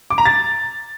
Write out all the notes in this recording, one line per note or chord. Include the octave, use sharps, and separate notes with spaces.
D6
A#5
A6